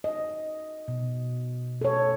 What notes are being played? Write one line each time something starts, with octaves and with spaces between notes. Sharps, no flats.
D#5
B2
A4 C#5